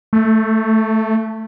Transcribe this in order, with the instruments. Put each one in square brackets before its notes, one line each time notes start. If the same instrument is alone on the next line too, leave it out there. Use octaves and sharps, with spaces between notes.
[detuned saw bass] A3